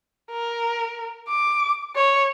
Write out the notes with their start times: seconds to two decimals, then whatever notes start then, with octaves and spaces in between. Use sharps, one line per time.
0.31 A#4
1.28 D6
1.96 C#5